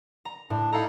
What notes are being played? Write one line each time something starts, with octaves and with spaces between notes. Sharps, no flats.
A#5
A2 D4
D#4 E4 A4 F5 A#5